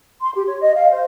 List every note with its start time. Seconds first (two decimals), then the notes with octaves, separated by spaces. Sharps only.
0.21 C6
0.35 G4
0.47 C#5
0.60 D#5
0.75 F5
0.91 C5